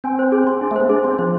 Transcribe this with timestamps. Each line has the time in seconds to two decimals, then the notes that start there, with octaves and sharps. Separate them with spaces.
0.04 C4 G#5
0.19 C5
0.32 G#4
0.47 C6
0.61 D4 G#5
0.71 A3
0.76 B3 C5
0.89 D4 G#4
1.04 C4 C6
1.19 F3 C5